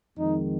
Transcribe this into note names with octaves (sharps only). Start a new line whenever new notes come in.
F2 D#3 G#3 D#4